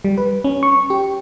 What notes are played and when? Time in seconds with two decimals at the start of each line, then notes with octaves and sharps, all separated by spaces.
0.05 G3
0.18 B4
0.44 C#4
0.63 C#6
0.90 G4